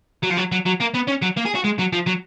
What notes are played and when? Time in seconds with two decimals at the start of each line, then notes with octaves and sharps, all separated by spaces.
0.23 F#3
0.31 F3
0.38 F#3
0.52 F#3
0.66 F#3
0.80 A#3
0.94 B3
1.07 C#4
1.22 F#3
1.37 A#3
1.45 G#4
1.55 F#4
1.64 G#3
1.79 F#3
1.93 F3
2.07 F#3